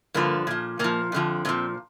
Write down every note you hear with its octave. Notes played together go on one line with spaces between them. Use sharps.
G2 D3 F3 A#3
A#2 F3
A#2 F3 A#3
F2 D3 F3
A#2 F3 C4